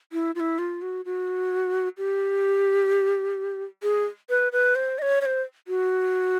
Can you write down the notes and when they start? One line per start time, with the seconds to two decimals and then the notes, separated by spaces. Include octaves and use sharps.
0.13 E4
0.35 F4
0.40 E4
0.59 F4
0.82 F#4
1.05 F#4
1.98 G4
3.83 G#4
4.30 B4
4.52 B4
4.75 C5
4.98 D#5
5.02 C#5
5.21 C#5
5.26 C5
5.68 F#4